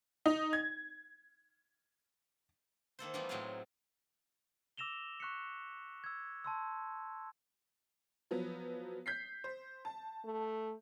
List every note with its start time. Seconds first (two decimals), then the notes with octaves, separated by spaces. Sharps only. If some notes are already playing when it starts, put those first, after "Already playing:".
0.26 D#4
0.53 G#6
2.99 D#3 A#3 A4 C5
3.14 E3 G3 A3 B3 D#4 F4
3.29 A2 F#3 C4 F4 G#4 F5
4.77 D6 E6 A#6 E7 F7 G7
5.20 C#6 F#6 B6 C#7
6.04 E6 G#6
6.44 A5 C6 E6
8.31 F3 F#3 B3
9.06 G6 B6 C7
9.44 C5
9.85 A5
10.25 A3